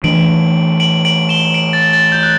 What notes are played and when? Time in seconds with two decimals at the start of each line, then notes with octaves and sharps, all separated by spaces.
0.04 E3 A3 D4 D7 F#7
0.80 D7 F#7
1.05 D7 F#7
1.29 E7 G7
1.54 D7 F#7
1.73 A6
1.93 A6
2.12 G6
2.23 F#6